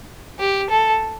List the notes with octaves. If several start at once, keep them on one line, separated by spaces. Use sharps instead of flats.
G4
A4